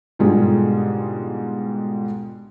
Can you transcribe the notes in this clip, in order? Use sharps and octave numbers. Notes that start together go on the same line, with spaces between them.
G#2 B2 D3 G3 F4 G#4